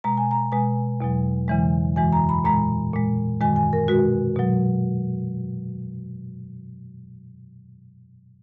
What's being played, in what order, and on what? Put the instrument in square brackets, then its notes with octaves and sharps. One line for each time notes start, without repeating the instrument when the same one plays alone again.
[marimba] B2 G#3 A#5
G#5
A#5
B2 G#3 G#5
E2 B2 F#3
E2 C#3 E3 G#3
F#2 E3 G#3 G#5
A#5
B5
A#2 G#3 A#5
A#2 G#3
F#2 D#3 G#3 G#5
G#5
A#4
B2 G#3 F#4
B2 F#3